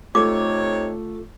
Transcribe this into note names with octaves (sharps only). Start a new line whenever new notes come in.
C3 A3 D#4 F4 A4 C#5 D6